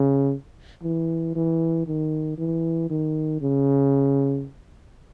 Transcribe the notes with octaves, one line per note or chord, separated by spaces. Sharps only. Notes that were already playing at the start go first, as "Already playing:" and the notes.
Already playing: C#3
E3
E3
D#3
E3
D#3
C#3